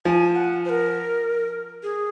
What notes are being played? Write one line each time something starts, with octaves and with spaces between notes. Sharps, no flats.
F3 G#5
F#5
C5
A#4
G#4